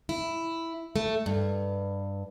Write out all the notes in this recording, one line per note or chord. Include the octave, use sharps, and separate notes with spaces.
E4
A3
G2